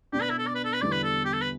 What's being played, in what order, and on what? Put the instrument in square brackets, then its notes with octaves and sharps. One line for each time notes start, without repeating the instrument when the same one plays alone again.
[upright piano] B2 B3 D4 [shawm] G4
[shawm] B4
E4
A4
D5
B4
A4
B4
[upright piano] E2 D3 G3 B3 E4 [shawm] D5
[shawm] B4
A4
G4
A4
B4